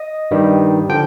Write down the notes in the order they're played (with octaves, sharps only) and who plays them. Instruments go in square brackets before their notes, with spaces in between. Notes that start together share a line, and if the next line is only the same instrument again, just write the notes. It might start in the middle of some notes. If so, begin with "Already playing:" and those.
Already playing: [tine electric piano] D#5
G2 D#3 G3
D3 F3 G5